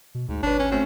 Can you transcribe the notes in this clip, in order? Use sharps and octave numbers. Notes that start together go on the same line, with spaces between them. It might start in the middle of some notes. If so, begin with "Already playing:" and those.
B2
D2 G#2
G#1 D4 B4 C#5
C#4
A3 C4 C#4 F#4